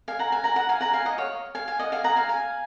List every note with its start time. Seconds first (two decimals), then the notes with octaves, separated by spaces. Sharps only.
0.08 F5 G#5
0.19 F#5 A#5
0.32 F5 G#5
0.44 F#5 A#5
0.56 F#5 A#5
0.69 F5 G#5
0.81 F#5 A#5
0.93 F5 G#5
1.05 D#5 F#5
1.18 C#5 F5
1.55 F5 G#5
1.68 F5 G#5
1.79 D#5 F#5
1.92 F5 G#5
2.04 F#5 A#5
2.16 F5 G#5
2.29 F5 G#5